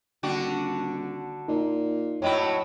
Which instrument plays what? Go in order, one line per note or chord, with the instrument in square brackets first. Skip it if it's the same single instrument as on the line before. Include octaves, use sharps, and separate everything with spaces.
[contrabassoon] D#1 [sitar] D3 D4 F#4
[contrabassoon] A#2 [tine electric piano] D#4
[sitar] A2 F#3 E4 [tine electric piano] C#5 D#5 B5